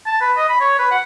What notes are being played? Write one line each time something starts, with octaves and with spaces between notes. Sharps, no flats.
A5
B4
D#5
B5
C#5
B4
F#5